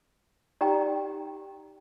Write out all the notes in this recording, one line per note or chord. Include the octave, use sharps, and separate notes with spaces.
D#4 G4 D5 G5 A#5